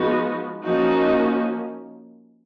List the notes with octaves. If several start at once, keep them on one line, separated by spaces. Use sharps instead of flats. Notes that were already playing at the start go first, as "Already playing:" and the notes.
Already playing: F3 G#3 B3 D#4 F#4
F3 A#3 C#4 D#4 F#4